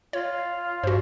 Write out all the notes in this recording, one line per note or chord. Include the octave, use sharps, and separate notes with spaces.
F4 C#5
G2 F#4 C5